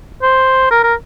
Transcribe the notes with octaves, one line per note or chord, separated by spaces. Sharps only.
C5
A#4
A#4